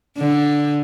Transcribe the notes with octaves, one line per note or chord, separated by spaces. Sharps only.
D3